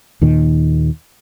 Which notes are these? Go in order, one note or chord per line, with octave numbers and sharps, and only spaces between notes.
D#2 A#2 D#3